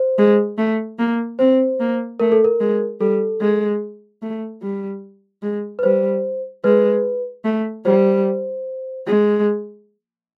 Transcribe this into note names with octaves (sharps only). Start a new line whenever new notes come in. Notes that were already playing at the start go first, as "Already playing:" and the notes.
Already playing: C5
G#3
A3
A#3
C4 C5
A#3
A3 A#4
A4
A#4
G#3
G3 A4
G#3
A3
G3
G#3
B4
G3 C5
G#3 B4
A3
G3 C5
G#3